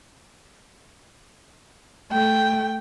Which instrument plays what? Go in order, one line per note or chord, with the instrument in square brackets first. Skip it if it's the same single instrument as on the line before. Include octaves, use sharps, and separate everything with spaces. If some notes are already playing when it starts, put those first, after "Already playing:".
[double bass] A3 [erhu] G5